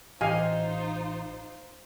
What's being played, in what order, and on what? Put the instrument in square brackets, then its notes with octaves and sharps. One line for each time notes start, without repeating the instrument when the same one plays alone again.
[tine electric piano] A1 [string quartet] D#4 F4 C5 [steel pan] G4 F5 G#5 [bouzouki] D#5